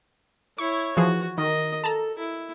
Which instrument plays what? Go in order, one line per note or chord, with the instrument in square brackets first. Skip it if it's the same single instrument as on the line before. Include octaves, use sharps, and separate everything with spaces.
[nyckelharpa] E4 C#5 [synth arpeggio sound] C#6
[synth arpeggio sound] E3 F3 G#4 [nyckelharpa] F#4
[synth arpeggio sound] D#3 [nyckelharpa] A#4 D#5
[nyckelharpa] A4 [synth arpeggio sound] A5 A#5
[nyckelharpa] E4